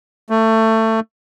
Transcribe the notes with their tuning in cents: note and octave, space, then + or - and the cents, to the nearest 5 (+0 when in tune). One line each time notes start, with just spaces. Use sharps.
A3 +20